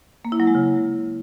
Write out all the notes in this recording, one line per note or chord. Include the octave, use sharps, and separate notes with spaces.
A#3
E4
F#3
G#3
C#3